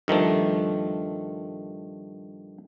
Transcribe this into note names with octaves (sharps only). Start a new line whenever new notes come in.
G2 D#3 F3 A3